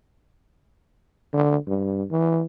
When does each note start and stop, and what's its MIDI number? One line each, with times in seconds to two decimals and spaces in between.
1.34 1.57 50
1.67 2.04 43
2.11 2.45 52